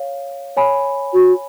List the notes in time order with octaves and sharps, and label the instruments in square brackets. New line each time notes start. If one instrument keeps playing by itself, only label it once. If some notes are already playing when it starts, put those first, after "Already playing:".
Already playing: [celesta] C#5 F5
C#5 G#5 B5
[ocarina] F#4